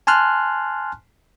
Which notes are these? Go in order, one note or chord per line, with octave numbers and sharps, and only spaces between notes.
G#5 A5 C6 F6 F#6